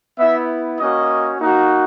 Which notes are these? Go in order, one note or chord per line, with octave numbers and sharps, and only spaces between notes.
B3 E4 E5
A#3 C#4 F#4 D#5
A#3 D#4 F#4